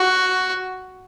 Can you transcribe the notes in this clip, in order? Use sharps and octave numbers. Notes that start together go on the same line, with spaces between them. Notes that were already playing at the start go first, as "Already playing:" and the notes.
Already playing: F#4